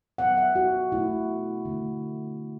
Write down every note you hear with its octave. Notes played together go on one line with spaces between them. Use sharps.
B2 F#3 B3 F#5
E5
F#4
B2 A3 E4
D3 A3